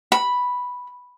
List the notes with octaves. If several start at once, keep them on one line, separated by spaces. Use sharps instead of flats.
B5